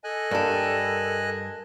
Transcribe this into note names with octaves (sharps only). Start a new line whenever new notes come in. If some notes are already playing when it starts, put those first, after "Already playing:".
A4 D#5 G#5 F#6
G2 G4 A#4 A5